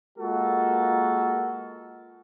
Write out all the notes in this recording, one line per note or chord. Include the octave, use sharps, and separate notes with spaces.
G#3 A#3 F4 F#4 A4 A#4